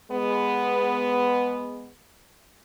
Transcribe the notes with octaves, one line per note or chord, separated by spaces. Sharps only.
G#3 B3